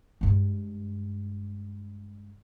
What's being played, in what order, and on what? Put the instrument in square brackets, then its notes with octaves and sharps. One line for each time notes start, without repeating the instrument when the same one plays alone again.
[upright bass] G2 G#3